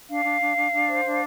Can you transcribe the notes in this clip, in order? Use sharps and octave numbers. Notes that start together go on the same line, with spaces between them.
D4 F5
D4
D4
D4
D4
C5
D4